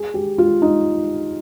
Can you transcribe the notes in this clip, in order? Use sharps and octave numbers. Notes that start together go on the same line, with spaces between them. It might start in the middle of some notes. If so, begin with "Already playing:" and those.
Already playing: G#4
G4
F4
D#4